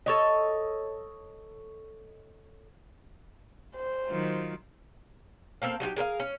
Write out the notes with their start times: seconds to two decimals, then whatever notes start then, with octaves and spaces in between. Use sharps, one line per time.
0.06 A4 C#5 D#5
3.76 C5
4.08 D#3 F#3 F4
5.62 A#3 C4 A4 F5
5.80 F#3 D#4 F4 G4
5.96 G#4 A#4 C5 F5
6.20 C#4